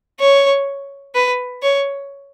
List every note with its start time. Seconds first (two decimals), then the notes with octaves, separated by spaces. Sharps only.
0.20 C#5
1.15 B4
1.62 C#5